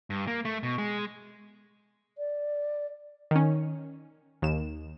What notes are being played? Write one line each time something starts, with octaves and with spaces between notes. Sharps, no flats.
G2
A#3
A3
B2
G#3
D5
D#3 C#4
D#2 E7